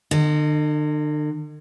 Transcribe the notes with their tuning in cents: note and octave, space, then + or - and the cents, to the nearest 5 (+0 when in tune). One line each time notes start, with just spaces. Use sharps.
D3 +45 D#5 -10